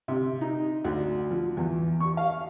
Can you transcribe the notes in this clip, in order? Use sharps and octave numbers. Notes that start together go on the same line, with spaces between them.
C3
D#4
D2
F3
E2
C#6
F5